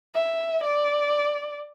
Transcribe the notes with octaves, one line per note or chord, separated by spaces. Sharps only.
E5
D5